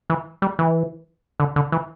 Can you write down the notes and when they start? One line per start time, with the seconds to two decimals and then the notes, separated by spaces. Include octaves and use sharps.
0.10 E3
0.42 G3
0.59 E3
1.40 D3
1.56 D3
1.72 E3